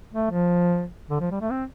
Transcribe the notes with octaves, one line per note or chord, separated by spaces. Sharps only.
A3
F3
D3
F3
G3
A3
C4